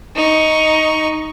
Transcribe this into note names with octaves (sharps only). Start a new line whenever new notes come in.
D#4 C#6